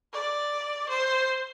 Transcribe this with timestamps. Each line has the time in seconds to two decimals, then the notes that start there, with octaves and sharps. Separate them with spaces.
0.13 D5
0.89 C5